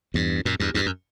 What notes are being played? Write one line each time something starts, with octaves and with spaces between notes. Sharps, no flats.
E2 G2
F#2 A#2
E2 G2
E2 G2
F#2